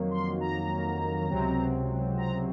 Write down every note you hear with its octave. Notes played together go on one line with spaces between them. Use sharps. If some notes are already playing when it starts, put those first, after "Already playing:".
Already playing: F2 D#3 F#3 A#3
C6
A#5
C#2 C3 F#3 C4
A#5